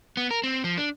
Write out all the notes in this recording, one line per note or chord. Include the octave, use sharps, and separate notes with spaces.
B3
A#4
C4
F3
D4